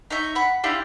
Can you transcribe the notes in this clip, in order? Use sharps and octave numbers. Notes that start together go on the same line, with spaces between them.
D#4 C#5 E5
F#5 B5
D4 E4 F4 G4